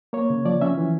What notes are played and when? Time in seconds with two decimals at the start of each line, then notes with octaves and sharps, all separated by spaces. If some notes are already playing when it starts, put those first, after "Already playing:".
0.13 A#3 C#5
0.30 C#3
0.45 F3 D5
0.61 C#4 E5
0.78 E3